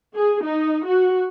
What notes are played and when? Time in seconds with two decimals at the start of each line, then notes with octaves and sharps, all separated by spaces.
0.15 G#4
0.44 D#4
0.86 F#4